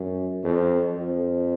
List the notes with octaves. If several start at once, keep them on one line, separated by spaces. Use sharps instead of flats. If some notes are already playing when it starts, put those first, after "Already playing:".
Already playing: F#2
F2
F2